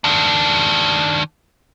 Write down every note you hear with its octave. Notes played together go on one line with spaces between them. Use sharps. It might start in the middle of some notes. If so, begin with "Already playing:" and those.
D#3 D4